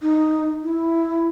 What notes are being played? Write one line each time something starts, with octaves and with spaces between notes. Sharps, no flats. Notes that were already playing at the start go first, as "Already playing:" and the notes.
D#4
E4